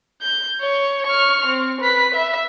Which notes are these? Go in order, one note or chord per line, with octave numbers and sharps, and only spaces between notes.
G6
C#5
C#6 F6
C4
B4 B6
E5